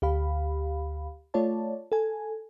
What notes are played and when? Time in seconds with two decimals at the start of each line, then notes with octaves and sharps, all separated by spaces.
0.02 D2 G4 F5 B5
1.34 A3 F4 C#5 D5 A5
1.92 A4 G#5